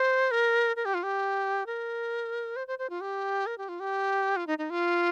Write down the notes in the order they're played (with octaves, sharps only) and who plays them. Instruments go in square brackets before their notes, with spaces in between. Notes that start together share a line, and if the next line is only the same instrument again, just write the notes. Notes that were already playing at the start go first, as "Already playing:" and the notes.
Already playing: [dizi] C5
A#4
A#4
G4
F4
G4
A#4
C5
C5
C5
F4
G4
A#4
G4
F4
G4
F4
D#4
D#4
F4